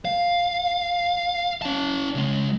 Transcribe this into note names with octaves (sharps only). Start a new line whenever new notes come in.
F5
C#4 A5
C#3 G#3